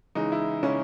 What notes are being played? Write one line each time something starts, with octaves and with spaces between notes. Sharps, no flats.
C#3 E3 G#3 D#4
E4
C#3 E3 G#3 C#4